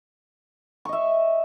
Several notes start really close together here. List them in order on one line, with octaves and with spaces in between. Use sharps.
C#6 D#5 E5